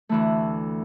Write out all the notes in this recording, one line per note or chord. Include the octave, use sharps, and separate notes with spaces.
D2 E3 A3